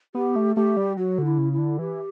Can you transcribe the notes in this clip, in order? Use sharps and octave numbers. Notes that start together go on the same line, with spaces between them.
B3 G4
A3
A3 G4
G3
F#3 F#4
D3
E4
C#3
E4
D3
E3 G4